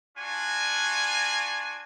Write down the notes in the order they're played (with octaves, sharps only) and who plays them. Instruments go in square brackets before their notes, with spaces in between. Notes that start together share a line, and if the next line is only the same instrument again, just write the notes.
[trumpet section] D4 F4 F#4 G#5